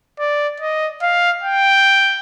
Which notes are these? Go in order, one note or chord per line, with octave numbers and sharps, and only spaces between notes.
D5
D#5
F5
G5